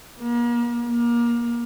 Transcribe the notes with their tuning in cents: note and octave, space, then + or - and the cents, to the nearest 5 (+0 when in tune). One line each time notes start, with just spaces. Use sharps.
A#3 +40
A#3 +25